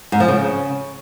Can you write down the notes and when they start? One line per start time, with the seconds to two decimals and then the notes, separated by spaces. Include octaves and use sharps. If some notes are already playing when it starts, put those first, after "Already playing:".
0.12 G#2
0.20 F3
0.28 C#3